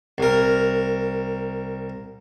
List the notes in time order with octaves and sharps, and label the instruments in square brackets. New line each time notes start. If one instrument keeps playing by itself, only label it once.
[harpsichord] C2 A#4